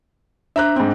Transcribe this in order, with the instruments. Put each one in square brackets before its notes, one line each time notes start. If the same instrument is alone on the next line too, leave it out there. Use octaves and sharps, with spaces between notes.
[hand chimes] D4 C5 D6 [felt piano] E5 A#5 F#6
[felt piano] G#2 C4